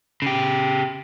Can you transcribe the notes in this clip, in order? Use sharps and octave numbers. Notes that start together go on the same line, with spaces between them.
C#3 G4